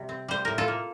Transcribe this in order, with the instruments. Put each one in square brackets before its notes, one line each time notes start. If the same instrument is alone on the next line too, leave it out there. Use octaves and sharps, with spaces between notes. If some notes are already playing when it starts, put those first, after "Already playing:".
Already playing: [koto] C3 G3
C4
G3 C5
A2 A#4
F4 A4
A#3